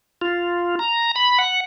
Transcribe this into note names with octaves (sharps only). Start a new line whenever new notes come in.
F4
A#5
B5
F#5